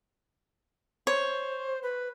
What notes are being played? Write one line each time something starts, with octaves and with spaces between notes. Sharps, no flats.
C5 C#5
B4